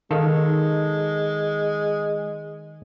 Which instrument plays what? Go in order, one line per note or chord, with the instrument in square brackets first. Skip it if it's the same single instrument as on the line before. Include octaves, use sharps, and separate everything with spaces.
[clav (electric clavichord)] D#3 A4 F5 [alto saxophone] G#3